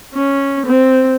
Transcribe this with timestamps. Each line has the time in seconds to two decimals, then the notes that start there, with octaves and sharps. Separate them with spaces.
0.14 C#4
0.66 C4